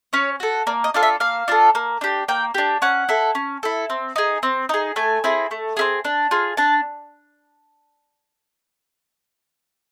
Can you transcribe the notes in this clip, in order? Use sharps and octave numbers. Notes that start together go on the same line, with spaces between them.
C#4 C#5
F#4 A4
A#3 D5
D#5
D4 F4 A4 F5
E5
A#3 F5
D4 F4 A4
A#3
D4 G4
A#3 G5
D4 G4
C#4 F#5
E4 A4
C#4
E4 A4
C4
D#4 G#4
C4
D#4 G#4
A3 G#5
C4 E4 G#4
A3
C4 E4 G#4
D4
F4 G#4
D4 A5